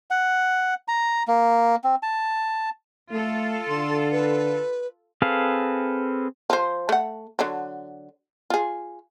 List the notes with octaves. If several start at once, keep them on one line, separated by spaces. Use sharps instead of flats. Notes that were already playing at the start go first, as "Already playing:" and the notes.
F#5
A#5
A#3
C4
A5
A3 F4 A4
D3 C6
B4
C4 G#4 A4 B4 F5
F3 C5
A3 F#5
D3 F#3
F4 G#4